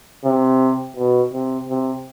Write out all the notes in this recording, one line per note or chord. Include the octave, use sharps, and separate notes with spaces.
C3
B2
C3
C3